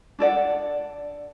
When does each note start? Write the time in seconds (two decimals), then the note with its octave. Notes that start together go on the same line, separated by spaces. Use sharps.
0.19 D4 A4 D5 F#5